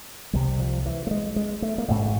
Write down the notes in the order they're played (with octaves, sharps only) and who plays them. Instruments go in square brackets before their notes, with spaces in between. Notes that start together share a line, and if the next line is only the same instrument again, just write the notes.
[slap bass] C2 C3 G3
F3
E3
A3
G#3
G#3
A3
A#3
A1 G#2 A3